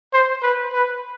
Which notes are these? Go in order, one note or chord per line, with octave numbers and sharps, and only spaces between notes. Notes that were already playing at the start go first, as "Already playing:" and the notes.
C5
B4
B4